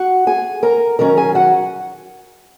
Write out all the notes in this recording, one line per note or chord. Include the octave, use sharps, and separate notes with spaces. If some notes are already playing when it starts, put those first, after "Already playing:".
Already playing: F#4 F#5
G#4 G#5
A#4 A#5
D#3 F#3 C#4 A#4 A#5
G#4 G#5
F#4 F#5